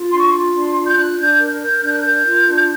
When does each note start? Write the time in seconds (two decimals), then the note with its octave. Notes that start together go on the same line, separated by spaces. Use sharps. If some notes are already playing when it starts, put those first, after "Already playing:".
Already playing: F4
0.11 D4 C6
0.19 C#6
0.27 C6
0.33 F4
0.54 D4
0.77 F4
0.87 G6
0.97 D4 F#6
1.18 D4 G6
1.40 A#4
1.61 A#4 G6
1.83 D4 G6
1.91 F#6
1.99 A#4 G6
2.26 F4
2.47 D4